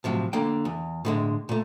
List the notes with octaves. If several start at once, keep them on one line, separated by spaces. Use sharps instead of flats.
A2 C3 F3 F#3
D3 A#3 G5
E2
A2 D3 G#3
A#2 A3